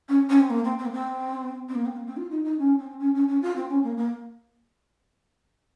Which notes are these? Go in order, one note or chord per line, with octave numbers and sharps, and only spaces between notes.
C#4
C#4
C4
A#3
C4
C4
A#3
C4
C4
A#3
C4
A#3
C4
F4
D#4
D#4
C#4
C4
C#4
C#4
C#4
F4
C4
C#4
A#3
A#3